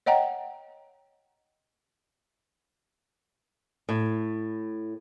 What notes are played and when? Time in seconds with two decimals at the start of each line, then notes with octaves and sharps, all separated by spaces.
0.06 C#5 D#5 F#5 G5 A#5
3.89 A2